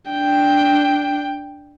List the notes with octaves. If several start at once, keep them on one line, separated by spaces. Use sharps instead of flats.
D4 G5